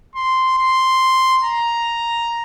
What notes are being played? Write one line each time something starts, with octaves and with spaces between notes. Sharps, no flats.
C6
C6
A#5